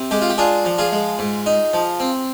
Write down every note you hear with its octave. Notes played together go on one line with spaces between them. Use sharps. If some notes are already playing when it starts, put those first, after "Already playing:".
Already playing: C3
G#3 G4
F4
G4
D4 F4 G#4
F3
F4 G#4
G#3
G#2
D#4
F3
C4